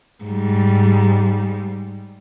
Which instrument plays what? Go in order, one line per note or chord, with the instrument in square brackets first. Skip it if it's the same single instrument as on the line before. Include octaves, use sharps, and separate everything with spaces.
[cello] G#2 G3